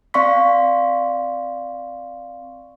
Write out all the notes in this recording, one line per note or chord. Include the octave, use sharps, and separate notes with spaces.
C4 D5 F5 C6 C#6 B6